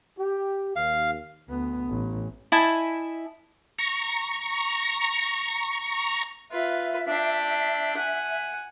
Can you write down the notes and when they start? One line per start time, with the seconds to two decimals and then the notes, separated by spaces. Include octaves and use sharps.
0.19 G4
0.76 D#2 F5
1.48 D2 B3
1.87 A1
2.52 E4 D#5 G#5 A5
3.79 A#5 C#6
6.51 F4 B4 E5
7.08 D4 G5
7.97 F#5 G#5